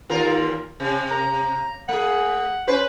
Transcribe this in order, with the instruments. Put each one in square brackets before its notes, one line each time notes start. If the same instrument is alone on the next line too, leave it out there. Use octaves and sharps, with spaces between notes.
[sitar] D#2 F4 A#4
C3
[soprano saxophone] A#5
[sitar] A3 G#4 [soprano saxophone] F#5
[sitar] C#4 B4 C5